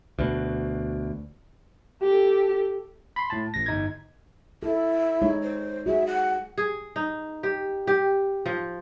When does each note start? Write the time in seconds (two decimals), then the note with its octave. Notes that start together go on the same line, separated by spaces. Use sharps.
0.19 D2 B2
2.02 G4 A4
3.16 B5 C6
3.30 A2 A5
3.54 A1 A#6
3.66 G1 D#4 G#6
4.63 E4 A4
5.22 G#3 D#4 C#5
5.43 C5
5.86 F#4 G#4 E5
6.07 F#5
6.58 G#4
6.96 D#4
7.43 G4
7.87 G4
8.46 F3